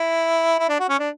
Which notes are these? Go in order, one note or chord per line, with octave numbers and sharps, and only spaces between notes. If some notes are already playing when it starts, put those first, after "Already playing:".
Already playing: E4
E4
D4
F#4
C#4
D4